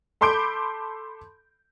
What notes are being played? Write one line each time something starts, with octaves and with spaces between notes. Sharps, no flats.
A4 B5 C6 D6 G6 D7